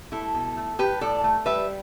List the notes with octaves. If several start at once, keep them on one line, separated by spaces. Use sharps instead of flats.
A3 E4 A4
B2
A3
A2 G4 B4
A2 A4 D5
A3
G3 B4 E5